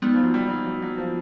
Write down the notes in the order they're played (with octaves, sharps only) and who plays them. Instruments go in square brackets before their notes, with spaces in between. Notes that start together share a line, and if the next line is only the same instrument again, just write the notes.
[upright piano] G3 [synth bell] G#3 B3 D#4
[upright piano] F3
F#3
G3
F#3
F#3
F#3
F3